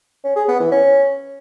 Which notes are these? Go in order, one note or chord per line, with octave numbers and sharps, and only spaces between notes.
C#4
G#4
B3
E3
C#4